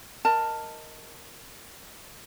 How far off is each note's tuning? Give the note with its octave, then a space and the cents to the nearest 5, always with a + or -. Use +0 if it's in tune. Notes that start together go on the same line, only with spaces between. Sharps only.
A#4 +0 D#5 +5 A5 +15